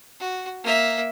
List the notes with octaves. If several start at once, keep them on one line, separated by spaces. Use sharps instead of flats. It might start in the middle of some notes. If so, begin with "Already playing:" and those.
F#4
A#3 E5